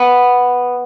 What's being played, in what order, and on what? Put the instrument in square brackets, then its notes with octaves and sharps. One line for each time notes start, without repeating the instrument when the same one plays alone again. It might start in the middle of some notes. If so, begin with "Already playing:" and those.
Already playing: [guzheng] B3